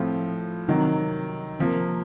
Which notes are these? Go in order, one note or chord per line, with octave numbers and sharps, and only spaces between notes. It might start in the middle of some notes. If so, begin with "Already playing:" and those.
Already playing: A2 F3 C4 F4
C3 D#3 F#3
C3 F3 A#3